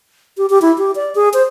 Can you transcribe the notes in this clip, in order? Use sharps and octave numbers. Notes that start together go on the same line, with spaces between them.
G4
G4
E4
G4
D5
G#4
C5